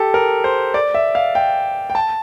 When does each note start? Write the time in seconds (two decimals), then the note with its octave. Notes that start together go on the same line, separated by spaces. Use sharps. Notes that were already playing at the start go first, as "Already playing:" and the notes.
Already playing: G4 A4
0.14 A#4
0.44 C5
0.74 D5
0.94 E5
1.15 F5
1.35 G5
1.90 G5
1.95 A5